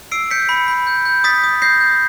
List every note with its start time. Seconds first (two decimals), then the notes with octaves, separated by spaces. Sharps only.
0.12 E6 C7 D7
0.31 G6 B6 C#7
0.49 B5
0.68 B5
0.87 G6
1.05 G6
1.24 D#6 A6 B6
1.44 D#6
1.62 G6 A#6 C7
1.80 G6